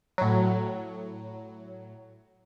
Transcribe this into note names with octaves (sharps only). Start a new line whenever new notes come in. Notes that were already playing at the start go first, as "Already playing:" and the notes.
A2 F#3